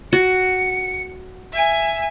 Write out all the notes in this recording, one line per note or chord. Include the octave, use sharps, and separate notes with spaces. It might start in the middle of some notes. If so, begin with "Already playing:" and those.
F#4 C#7
E5 G#5